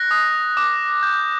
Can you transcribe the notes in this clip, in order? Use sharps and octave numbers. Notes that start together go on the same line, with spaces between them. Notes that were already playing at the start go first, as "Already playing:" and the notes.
Already playing: F#6 A#6
D#6
D6
G6